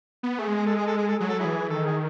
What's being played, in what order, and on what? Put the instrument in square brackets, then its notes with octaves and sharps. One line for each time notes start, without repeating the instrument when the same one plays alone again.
[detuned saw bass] B3
[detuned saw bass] A3 [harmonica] G#4
[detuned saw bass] G#3
[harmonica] G#4
A4
G#4
A4
G#4
A4
[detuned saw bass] F#3 [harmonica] G#4
[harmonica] A4
E4 G#4
[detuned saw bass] E3
[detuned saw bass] D#3 [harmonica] A4
[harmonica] G#4